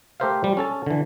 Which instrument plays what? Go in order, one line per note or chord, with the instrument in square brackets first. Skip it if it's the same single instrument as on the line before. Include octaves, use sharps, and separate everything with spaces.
[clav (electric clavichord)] A3 G4 A#4 C5 E5 F5
G3
C#4 A4 A5
D3 E3